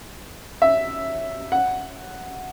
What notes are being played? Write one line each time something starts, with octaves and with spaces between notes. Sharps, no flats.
E5
F#5